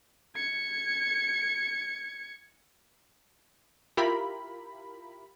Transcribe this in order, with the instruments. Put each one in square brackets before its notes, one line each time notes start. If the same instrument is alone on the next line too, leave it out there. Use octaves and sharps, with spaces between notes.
[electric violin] G#6 C#7
[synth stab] E4 F4 G4 A#4 B5